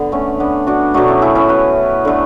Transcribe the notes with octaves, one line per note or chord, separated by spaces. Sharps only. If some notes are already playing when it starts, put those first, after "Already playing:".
Already playing: D3 B3
A3 C#4
B3 D4
D4 F#4
B2 F#3 A3 D4 F#4
C#4 E4
E4 G#4
C#4 E4
G#4 B4
D3 A3